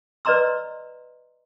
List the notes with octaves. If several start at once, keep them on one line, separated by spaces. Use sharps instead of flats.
B4 D5 D#5 A#5 C6 E6